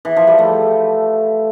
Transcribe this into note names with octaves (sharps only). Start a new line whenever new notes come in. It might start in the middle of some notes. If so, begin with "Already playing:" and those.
E3
F3
G3
A3